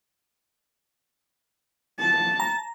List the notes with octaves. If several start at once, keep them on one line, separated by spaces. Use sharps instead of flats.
A5
A#5